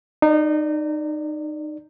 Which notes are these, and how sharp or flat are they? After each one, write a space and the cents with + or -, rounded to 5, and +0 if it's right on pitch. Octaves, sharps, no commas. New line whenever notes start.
D#4 -25 D5 +0